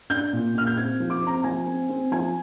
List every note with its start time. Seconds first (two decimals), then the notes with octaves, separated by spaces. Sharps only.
0.10 D4 G6
0.33 A#2
0.54 A#2 F6
0.67 G6
0.77 C4 G#6
1.00 F3
1.10 D6
1.22 C4 A#5
1.44 F3 G#5
1.66 C4
1.89 C4
2.12 F3 G#5